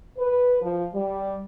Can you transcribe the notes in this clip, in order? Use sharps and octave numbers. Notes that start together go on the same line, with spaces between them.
B4
F3
G3